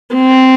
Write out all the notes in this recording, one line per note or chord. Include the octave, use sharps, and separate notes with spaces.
C4